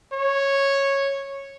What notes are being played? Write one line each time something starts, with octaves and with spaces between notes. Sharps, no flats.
C#5